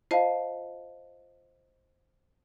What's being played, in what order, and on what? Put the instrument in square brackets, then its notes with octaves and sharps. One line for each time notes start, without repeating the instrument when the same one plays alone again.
[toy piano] F4 F5 [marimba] C5 D#5 A5